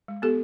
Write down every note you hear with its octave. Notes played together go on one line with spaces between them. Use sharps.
G#3
B3 G4 A4